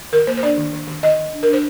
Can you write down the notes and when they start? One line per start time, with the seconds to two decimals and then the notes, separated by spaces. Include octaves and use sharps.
0.12 D#3 A#4
0.27 A#3 C5
0.37 C5
0.43 D4 D5
0.58 D#3
0.73 D#3
0.88 D#3
1.03 D#3 D#5
1.18 D#3
1.33 D4
1.43 A#4
1.48 D4 C5